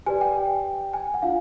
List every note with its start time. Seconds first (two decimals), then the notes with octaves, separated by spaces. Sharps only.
0.06 G4 B4 D5 G#5
0.21 G5
0.94 G#5
1.14 F#5
1.22 D4 F4 F5